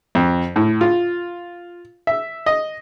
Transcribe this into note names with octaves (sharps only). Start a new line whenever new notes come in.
F2
A2
F4
E5
D#5